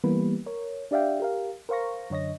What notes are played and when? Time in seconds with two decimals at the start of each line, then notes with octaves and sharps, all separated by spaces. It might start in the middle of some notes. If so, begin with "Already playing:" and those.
0.04 E3 G3 A#3 B3 B4
0.46 A#4 C#5
0.91 D4 G4 D5 E5 F5 G5
1.20 G4 A#4 F5
1.69 A#4 C5 F5 C#6 A#6
2.10 F#2 D3 C#5 D#5 A#6